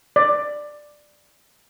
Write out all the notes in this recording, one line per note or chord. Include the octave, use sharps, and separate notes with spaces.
D5